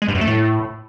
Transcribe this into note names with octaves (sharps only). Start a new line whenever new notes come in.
G#3
G2
F#2
A3
A2